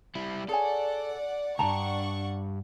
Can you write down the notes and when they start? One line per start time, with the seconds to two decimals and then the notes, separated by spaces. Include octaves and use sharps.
0.15 G3 E4
0.49 G#4 A4 C#5 D5 F#5 G#5
1.59 C#2 G2 D4 F#5 G5 A5 A#5 C#6